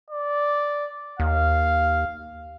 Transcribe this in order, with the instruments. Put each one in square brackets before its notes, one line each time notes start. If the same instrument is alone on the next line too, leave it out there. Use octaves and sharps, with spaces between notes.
[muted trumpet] D5
[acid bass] D#2 [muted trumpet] F5